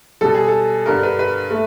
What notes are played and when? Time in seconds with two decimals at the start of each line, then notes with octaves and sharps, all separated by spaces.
0.21 B2 G3 A4
0.35 G#4
0.48 A4
0.86 G2 D3 G3 A#4
1.03 B4
1.19 B4
1.51 A3